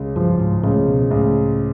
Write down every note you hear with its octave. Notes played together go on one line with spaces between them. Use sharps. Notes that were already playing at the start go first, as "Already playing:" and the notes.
Already playing: C#2 C#3
G2 F3
G#2
C#2 A2
B2
C#2 A2